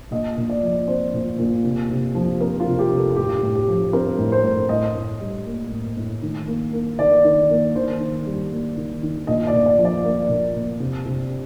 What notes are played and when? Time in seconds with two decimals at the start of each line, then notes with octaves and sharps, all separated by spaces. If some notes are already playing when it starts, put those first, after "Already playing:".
0.11 A#2 D#5
0.37 A#2
0.49 D5
0.63 F3
0.88 C4 C5
1.14 A#2
1.39 A#2
1.64 C3
1.90 C3
2.15 F3
2.41 C4 A#4
2.60 F4
2.67 C3
2.79 G4
2.92 C3
2.97 A4
3.11 F4
3.16 A2 G4
3.43 A2
3.55 G4
3.68 F3
3.93 C4 A#4
4.19 A2
4.32 C5
4.44 A2
4.69 A2 D#5
4.96 A2
5.21 G3
5.46 A#3
5.72 A2
5.97 A2
6.22 D#3
6.48 A#3
6.73 A#3
6.99 D#3 D5
7.24 D#3
7.50 A#3
7.76 D#3 C5
8.00 D#3
8.27 G3
8.52 A#3
8.77 D#3
9.03 D#3
9.27 A#2 D#5
9.47 D5
9.53 A#2
9.66 D5
9.78 F3
9.85 D5
10.05 A#3
10.29 A#2
10.56 A#2
10.80 C3
11.06 C3